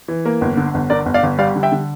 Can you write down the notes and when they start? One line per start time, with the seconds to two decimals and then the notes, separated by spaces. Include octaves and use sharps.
0.08 E3
0.25 A#3
0.41 G1
0.57 D3
0.74 G1
0.90 D3 A#4 D5
1.06 G1
1.14 D5 F5
1.23 G1
1.38 G3 D5 F5
1.55 D3
1.63 E5 G5
1.72 D3